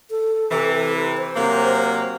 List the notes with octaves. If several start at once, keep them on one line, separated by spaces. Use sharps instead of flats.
A4
C3 E3
C5
C3 F#3 A#3